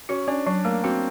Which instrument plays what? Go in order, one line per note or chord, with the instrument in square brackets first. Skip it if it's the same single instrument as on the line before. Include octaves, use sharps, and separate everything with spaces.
[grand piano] C#4 [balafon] F#4
[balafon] C#4 [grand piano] D4
[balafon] F#3 [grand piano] D4
[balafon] A3 [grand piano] A#3
[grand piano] C4 [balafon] F#4